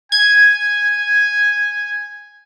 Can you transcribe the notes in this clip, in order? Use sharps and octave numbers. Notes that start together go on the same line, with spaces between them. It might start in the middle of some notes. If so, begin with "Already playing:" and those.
G#5 G#6